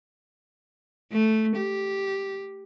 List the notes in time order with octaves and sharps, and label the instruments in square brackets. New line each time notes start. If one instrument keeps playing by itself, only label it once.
[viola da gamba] A3
G4